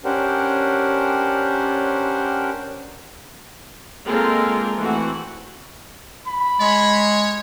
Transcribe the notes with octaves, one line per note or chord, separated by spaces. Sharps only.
C#4 D4 G4 A#4 C5 F#5
G#3 A#3 C4 F4 A4 A#4
E3 A3 C4 F#4 F#5
B5
G#3 C#5